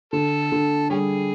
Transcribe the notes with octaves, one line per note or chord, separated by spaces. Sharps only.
D3 A4
D3
G3 C#4 G#4